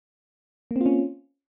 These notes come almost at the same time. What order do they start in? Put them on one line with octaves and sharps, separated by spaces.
A#3 C4 F4 C#4